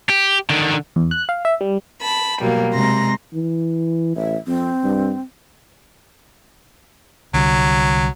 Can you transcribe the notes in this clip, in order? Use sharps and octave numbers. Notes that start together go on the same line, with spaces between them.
G4
D3 D#3
E2
F#6
F5
E5
G3
A5 B5
B2 F#3 G3 A#3
C3 G#3 A#5 C6 A#6
E3
A1 E5
F2 C4
G2
C2 D3 F#3 G3